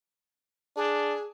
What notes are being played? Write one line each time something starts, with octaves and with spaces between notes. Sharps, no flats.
D4 G#4